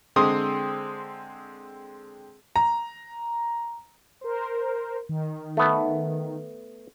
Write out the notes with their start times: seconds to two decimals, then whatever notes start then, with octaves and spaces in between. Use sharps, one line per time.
0.16 D3 G#3 C4 C6 D#6
2.56 A#5
4.21 A#4 C5
5.09 D#3
5.57 A3 B3